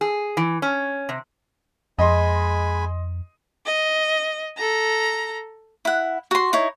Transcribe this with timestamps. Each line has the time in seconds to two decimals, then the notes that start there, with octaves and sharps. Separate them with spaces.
0.01 G#4
0.37 E3
0.62 C#4
1.09 C3
1.99 F2 G#3 D#5 G#5 B5 C6
3.66 D#5
4.57 A4 A#5
5.85 E4 F#5
6.31 F#4 C6
6.53 D#4 E4 C#5